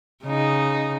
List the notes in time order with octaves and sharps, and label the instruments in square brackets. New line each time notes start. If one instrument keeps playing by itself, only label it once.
[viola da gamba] C#3 D#4